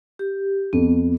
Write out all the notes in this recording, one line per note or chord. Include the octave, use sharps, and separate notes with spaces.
G4
F2 B3